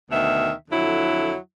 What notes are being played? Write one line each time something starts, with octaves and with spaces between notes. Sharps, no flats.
D2 B2 D#3 E5
F2 D3 F#3 E4